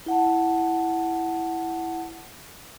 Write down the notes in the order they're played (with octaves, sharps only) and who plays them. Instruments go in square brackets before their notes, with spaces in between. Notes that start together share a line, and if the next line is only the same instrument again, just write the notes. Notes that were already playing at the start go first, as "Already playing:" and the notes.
[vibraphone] E4 F#5 A5